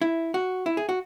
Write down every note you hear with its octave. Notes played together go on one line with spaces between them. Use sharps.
E4
F#4
E4
G#4
F#4